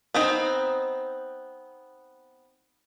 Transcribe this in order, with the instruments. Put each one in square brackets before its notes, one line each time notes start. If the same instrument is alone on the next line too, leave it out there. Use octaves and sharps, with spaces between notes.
[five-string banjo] B3 C4 D#4